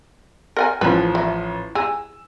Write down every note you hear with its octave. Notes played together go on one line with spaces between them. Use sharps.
A#4 F#5 G#5
A1 F3 C#4 B4
E3
G#4 E6